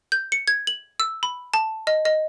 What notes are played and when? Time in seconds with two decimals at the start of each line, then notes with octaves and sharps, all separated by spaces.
0.12 G6
0.32 C#7
0.48 G#6
0.67 F#7
1.00 E6
1.23 B5
1.54 A5
1.87 D#5
2.05 D#5